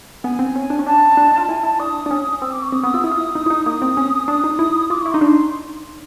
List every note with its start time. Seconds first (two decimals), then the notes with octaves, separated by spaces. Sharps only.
0.24 B3 G#5
0.39 C4
0.56 C#4
0.70 D4
0.79 C#4
0.86 D4 A5
1.17 D4
1.27 D#4
1.37 F4
1.49 E4 G#5
1.63 E4 A5
1.79 D4 D#6
2.06 D4
2.11 C#4
2.42 C4 E6
2.52 D6
2.62 C#6
2.72 C4 D#6
2.83 B3 D#6
2.93 F4 E6
3.04 E4 D#6
3.11 F4
3.20 E4
3.35 D#4
3.46 E4
3.50 D#4
3.66 A#3 D#6
3.82 C4
3.97 C#4
4.28 D4 D#6
4.44 D#4
4.59 E4
4.90 F4 D6
5.01 C#6
5.06 E4
5.11 D#4 C6
5.21 D4